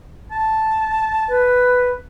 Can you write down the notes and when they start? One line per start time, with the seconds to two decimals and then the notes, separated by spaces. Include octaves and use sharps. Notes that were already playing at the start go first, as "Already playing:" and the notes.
0.32 A5
1.28 B4